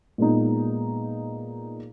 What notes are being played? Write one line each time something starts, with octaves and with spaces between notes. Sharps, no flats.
A#2 G#3 B3 D#4